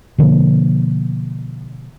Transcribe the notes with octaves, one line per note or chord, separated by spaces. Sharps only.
B2 D3 F3 A#3